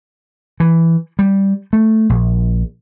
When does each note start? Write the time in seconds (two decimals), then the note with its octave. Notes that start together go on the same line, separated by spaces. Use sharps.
0.60 E3
1.19 G3
1.73 A3
2.10 A#1